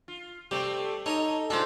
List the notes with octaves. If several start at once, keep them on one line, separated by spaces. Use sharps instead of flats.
F4
G3 A3 C4 G4
D#4 A4 C#5 A#5 D#6
G#3 D4 F4 A4 C5